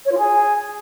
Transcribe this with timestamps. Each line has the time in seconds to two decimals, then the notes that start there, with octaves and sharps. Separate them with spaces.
0.05 C#5
0.11 F4
0.18 G#4